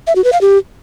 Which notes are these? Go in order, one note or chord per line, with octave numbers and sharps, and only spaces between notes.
E5
F#4
B4
F5
G4